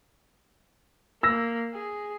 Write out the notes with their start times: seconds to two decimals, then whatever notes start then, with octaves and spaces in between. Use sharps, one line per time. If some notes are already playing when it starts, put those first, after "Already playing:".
1.23 A#3 E6 A#6
1.74 G#4